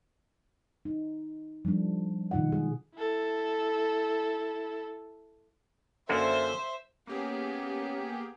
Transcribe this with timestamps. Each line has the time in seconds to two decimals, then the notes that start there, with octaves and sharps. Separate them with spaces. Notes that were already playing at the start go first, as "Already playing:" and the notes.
0.85 D#4
1.65 F3 G3 A3 D4
2.31 B2 D#3 D#4 F4 F#5
2.52 G#3 G#4
2.95 E4 A4
6.09 F#2 D3 A#3 C5 E5
7.07 A#3 B3 C#4 G4 G#4